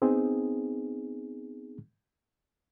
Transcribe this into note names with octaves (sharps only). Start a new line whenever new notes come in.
B3 C4 D#4 G#4